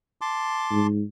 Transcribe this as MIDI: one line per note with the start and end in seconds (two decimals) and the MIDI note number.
0.21 0.87 81
0.21 0.87 84
0.21 0.87 86
0.71 1.02 44